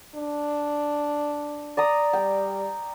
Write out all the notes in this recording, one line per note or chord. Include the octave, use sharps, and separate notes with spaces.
D4
D5 A#5 D#6
G3 G5